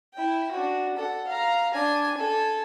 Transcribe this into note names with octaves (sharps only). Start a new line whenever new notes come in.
E4 G5
D4 F#4
A4 F#5
F5 A#5
D4 G#5
A4 G#5